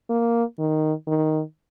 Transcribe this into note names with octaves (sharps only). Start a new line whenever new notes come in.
A#3
D#3
D#3